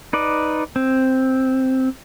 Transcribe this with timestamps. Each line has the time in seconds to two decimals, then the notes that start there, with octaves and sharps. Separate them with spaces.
0.13 D#4 B4 D5
0.76 C4